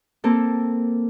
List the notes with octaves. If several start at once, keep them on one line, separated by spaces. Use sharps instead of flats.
A#3 C4 A4